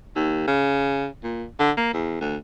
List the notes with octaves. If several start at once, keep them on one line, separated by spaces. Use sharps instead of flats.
D#2
C#3
A#2
D3
A#3
E2
D2